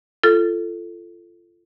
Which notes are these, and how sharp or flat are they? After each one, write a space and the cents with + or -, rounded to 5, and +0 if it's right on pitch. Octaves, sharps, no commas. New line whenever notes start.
F4 -25 A4 +0